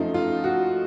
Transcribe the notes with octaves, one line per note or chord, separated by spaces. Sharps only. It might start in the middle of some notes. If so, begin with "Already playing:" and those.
Already playing: F#2 F3 A3 D#4
F4
F#4